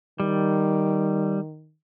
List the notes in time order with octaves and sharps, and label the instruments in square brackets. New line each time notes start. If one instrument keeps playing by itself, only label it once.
[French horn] D#3 [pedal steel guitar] G3